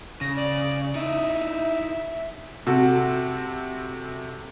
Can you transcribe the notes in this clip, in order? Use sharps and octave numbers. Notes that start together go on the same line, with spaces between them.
C#3 A#6
D5
D#4 E4 E5
C3 F#4 A4